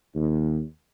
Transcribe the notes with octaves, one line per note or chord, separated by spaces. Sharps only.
D#2